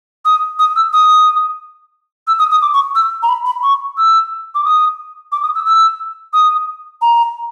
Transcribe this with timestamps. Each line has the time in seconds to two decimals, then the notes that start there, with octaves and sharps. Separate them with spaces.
0.25 D#6
0.59 D#6
0.76 E6
0.93 D#6
2.27 E6
2.39 D#6
2.51 D#6
2.62 D6
2.74 C#6
2.95 E6
3.23 A#5
3.29 B5
3.46 B5
3.63 C#6
3.97 E6
4.55 D6
4.65 D#6
5.32 D6
5.43 D#6
5.55 E6
5.66 E6
6.33 D#6
7.02 A#5